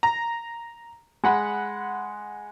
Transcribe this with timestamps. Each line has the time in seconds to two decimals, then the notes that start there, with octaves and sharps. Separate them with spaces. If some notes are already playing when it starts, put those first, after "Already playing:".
0.03 A#5
1.24 G#3 F#5 B5